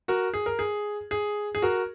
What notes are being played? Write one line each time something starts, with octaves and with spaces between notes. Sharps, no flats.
F#4 A#4
G#4
A#4
G#4
G#4
G#4
F#4 A#4